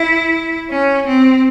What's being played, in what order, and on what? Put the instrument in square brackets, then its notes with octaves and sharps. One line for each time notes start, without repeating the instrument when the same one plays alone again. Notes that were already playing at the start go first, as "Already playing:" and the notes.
Already playing: [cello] E4
C#4
C4